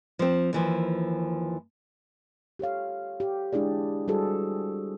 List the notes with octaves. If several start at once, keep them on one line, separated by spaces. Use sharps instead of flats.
F3 C4
D#2 E3 F3
G4 A4 C#5 F5
G4
G#3 D4 E4 G#4 D5
G3 F#4 G#4 A4 C5